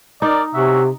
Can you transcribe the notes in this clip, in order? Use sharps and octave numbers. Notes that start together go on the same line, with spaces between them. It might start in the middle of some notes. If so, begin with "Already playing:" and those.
D#4 A#4 D5
C3 C#4 F#4 E5